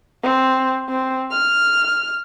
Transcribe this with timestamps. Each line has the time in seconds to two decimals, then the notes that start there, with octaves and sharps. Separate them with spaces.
0.24 C4
0.89 C4
1.32 F6